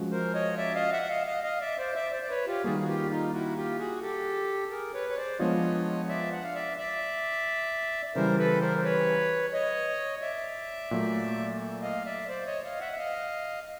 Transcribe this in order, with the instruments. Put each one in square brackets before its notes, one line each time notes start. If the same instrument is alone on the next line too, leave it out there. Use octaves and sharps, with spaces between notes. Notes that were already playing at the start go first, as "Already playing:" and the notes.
Already playing: [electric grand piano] F3 G#3 C#4 F#4
[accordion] A#4 C5
C#5 D#5
D5 E5
D#5 F5
E5 F#5
E5
D#5 F5
D#5 F5
D#5 F5
D5 E5
C5 D5
D5 E5
C5 D5
D5
B4 C#5
F4 G4
[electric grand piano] D#3 G3 A#3 [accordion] F#4 G#4
[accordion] F#4
F4 G4
D#4 F4
E4 F#4
F4 G4
F#4 G#4
G4 A4
G#4 A#4
B4 C#5
C#5
C5 D5
[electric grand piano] F3 G#3 B3 D4 F4 [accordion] C#5 D#5
[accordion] D5 E5
F#5
F5
D5 E5
D5 E5
[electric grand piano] C#3 E3 G3 [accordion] A#4 C5
[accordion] A4 B4
A#4 C5
C5
B4 C#5
C#5 D#5
D5 E5
[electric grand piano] A#2 F#3 A3
[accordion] D#5 F5
D5 E5
C5 D5
C#5 D#5
D#5 F5
E5 F#5
E5
D#5 F5